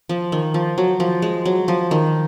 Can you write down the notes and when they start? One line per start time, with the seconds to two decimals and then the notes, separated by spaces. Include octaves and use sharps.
0.09 F3
0.32 D#3
0.54 F3
0.78 F#3
1.00 F3
1.22 G#3
1.46 F#3
1.68 F3
1.91 D#3